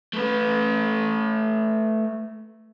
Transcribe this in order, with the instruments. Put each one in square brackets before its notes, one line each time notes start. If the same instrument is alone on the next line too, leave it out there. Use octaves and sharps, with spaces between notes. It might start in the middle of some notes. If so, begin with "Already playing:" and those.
[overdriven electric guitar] A3 B4